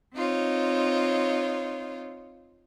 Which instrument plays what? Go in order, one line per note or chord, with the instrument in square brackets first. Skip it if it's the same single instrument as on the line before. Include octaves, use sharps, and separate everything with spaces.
[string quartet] C4 D#4 F4 C#5